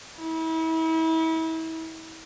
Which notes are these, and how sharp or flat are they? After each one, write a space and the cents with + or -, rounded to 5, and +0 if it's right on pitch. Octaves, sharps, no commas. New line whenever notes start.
E4 -35